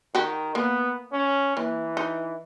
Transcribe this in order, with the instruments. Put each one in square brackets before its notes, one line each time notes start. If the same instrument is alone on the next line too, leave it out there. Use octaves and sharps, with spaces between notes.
[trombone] D#3 [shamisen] F#4 G4
[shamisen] A#3 [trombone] B3
[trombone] C#4
[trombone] E3 [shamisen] A#3
[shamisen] D#4